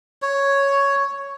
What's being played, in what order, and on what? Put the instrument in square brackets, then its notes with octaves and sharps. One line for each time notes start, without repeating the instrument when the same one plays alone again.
[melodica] C#5